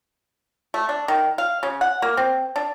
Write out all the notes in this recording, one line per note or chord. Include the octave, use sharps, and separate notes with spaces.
A3
D4
D#3
F5
C#3
F#5
A#3
C4
D4